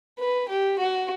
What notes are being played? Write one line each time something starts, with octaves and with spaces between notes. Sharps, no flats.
B4
G4
F#4